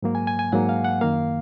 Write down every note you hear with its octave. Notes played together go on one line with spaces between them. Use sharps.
G#2 F#3 A#3
G#5
G#5
G#5
G#2 F#3 A#3 F#5
F5
F#5
F#2 D#3 A#3 F5